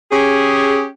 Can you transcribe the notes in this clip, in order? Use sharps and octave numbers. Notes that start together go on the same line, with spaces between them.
C#4 G4 G#4